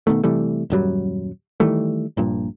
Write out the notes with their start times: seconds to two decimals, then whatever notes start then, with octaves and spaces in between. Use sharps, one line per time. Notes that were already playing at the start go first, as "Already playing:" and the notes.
0.07 B2 D3 D#3 A3
0.24 C3 E3 G3 A3
0.70 D#1 F#2 F#3 G3
1.60 D#3 E3 G3 A3
2.17 A#1 G2 A#2